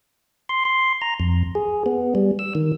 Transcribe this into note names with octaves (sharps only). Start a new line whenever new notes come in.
C6
C6
A#5
F2
G#4
B3
G3
E6
D#3